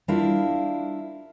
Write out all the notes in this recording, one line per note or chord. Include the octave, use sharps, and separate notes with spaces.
G3 D4 E4 F4 A#4 F5